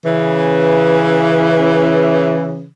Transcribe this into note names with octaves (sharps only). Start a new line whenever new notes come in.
C#3 E3